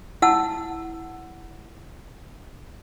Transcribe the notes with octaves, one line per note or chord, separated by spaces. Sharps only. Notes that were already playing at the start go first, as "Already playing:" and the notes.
E4 F#5 A5 E6